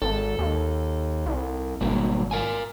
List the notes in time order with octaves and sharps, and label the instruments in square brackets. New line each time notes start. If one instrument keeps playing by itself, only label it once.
[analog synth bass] G#1 [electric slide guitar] A4
[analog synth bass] D#2
C2
[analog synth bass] G#1 [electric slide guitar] B2 G3 A#3
[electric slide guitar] A#4 F5 G#5